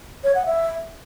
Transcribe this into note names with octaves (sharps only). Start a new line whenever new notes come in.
C#5
F#5
E5